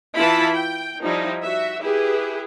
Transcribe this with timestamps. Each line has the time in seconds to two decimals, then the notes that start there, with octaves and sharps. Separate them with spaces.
0.17 E3 E4 F4 A5 B5
0.54 G5
1.03 F3 G3 D#4 E4
1.42 F#4 E5
1.81 E4 G4 G#4 B4